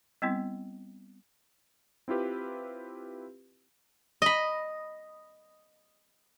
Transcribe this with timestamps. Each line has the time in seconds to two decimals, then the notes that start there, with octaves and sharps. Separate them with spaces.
0.22 G3 B3 C4 E4
2.08 C4 E4 F4 G4 B4
4.22 D#5 B5